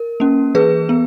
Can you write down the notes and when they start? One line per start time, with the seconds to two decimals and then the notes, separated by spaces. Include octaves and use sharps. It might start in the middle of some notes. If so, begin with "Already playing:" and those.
Already playing: A#4
0.20 A#3 C#4
0.55 E3 G#4 B4
0.89 B3